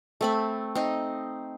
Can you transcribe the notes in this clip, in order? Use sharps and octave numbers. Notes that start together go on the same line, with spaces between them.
A3 C4 B5
C4 D#4